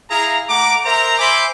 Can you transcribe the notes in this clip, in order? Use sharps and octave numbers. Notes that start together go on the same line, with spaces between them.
E4 G#4 F5 A#5
A3 F#5 A#5 D6
A#4 C5 E5 A#5
C5 E5 G#5 B5 C6 D6